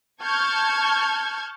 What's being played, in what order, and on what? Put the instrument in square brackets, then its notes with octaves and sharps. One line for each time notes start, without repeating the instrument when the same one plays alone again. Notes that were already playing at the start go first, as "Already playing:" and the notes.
[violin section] A5 C#6 F6 G6 G#6